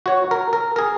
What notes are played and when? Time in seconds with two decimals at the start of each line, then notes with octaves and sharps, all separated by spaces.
0.06 F#4 C#5
0.31 A#4
0.53 A#4
0.76 G#4 A#4